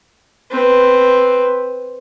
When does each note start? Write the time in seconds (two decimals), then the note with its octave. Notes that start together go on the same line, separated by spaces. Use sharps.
0.50 C4 B4